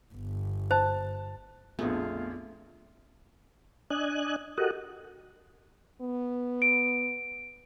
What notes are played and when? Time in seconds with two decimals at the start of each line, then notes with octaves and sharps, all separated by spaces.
0.14 G1
0.71 C5 A5
1.79 A#1 F2 A3 B3 F4 G#4
3.90 D4 D#5 G#5 F#6
4.58 F#4 G4 A4 A#4 D#5 F#5
6.01 B3
6.62 D7